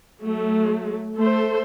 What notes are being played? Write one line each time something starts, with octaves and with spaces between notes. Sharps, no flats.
F#3 A3
A3 A4 C5